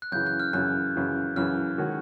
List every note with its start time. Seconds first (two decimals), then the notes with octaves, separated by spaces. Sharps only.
0.02 F#6
0.12 F#2 C#3 E3 G6
0.26 F#6
0.40 F6
0.53 F#2 C#3 E3 F#6
0.96 F#2 C#3 E3
1.36 F#2 C#3 E3 F6
1.78 D#3 G#3 C#4 F#4